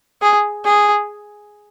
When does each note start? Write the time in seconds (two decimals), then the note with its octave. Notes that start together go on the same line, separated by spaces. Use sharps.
0.22 G#4
0.65 G#4